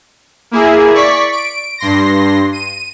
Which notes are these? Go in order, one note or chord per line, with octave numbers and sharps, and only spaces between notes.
A#3 E4 G#4
D5 C#6 B6
D7
G2 C6 A#6
D#7